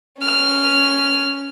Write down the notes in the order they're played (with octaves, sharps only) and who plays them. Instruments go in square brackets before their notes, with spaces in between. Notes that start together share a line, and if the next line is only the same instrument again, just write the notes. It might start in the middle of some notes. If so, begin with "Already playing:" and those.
[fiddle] C#4 F6